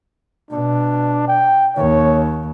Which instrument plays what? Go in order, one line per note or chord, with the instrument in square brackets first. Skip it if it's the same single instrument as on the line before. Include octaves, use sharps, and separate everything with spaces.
[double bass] B2 [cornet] D4
[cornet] G5
[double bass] D#2 [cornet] C#5